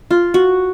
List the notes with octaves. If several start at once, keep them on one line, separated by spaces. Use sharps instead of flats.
F4
F#4